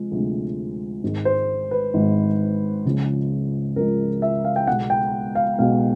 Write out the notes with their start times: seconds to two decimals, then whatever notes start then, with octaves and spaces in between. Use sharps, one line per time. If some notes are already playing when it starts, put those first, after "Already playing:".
Already playing: C3 F3 G#3
0.11 D2 C3 F3 G#3
1.03 G#1 G#2 D#3 G#3
1.25 C5
1.71 B4
1.94 G#1 G#2 D#3 G#3
2.85 C#2 C#3 F3 G#3
3.76 C#2 C#3 F3 G#3 A#4
4.22 E5
4.45 F5
4.56 G5
4.67 B1 B2 G#3 F#5
4.90 G5
5.35 F5
5.58 B1 B2 G#3 F5